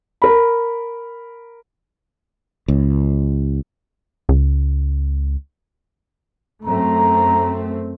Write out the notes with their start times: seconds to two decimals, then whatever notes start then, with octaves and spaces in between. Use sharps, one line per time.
0.22 A#4 B5
2.68 C#2
4.29 C#2
6.65 F#2 A3 C4 A#5